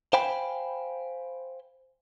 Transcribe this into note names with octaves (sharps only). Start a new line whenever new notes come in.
C5 F5 G5 G#5 B5